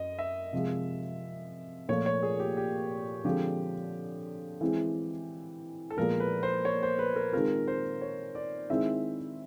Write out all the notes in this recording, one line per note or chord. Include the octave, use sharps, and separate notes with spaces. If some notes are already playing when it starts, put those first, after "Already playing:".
Already playing: F#2 D#5
E5
C3 F3 G#3
A#2 F3 A3 C#5
C#5
G#4
G4
G4
D3 F3 G#3 C4 G4
E3 G#3 C4 E4
A4
A#2 F3 G#3 B3 A#4
B4
C5
C#5
C5
B4
A#4
D#3 G#3 C4 F4 A#4
C5
C#5
D5
D#3 G#3 C4 E4 E5